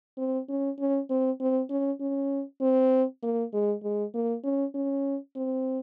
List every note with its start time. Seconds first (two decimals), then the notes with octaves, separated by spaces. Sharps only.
0.18 C4
0.49 C#4
0.79 C#4
1.10 C4
1.40 C4
1.70 C#4
2.00 C#4
2.61 C4
3.23 A#3
3.53 G#3
3.83 G#3
4.14 A#3
4.43 C#4
4.74 C#4
5.36 C4